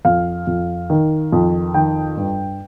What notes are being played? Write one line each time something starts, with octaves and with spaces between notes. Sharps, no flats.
F2 F5
F2
D#3
F2
D#3 G5
G2